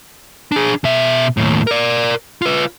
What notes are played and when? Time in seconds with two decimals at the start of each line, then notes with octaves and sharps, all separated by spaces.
0.52 D4 G#4
0.84 B2 E5
1.37 D#2 A2
1.67 A#4 D5
2.42 F4 B4